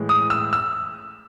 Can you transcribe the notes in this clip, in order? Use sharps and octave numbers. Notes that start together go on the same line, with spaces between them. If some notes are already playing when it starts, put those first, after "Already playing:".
Already playing: A2 E3 G#3
D#6
E6
E6